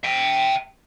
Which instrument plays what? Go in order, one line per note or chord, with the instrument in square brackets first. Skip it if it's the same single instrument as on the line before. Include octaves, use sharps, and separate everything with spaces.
[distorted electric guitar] E5 G5